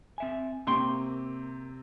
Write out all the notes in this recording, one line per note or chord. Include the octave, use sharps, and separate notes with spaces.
C4 E5 G#5
C3 A#3 C4 G5 C6 C#6